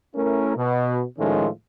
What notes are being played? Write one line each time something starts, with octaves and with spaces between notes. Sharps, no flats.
A3 C#4 E4 A#4
B2
A2 D#3 F3 G#3 A3 C#4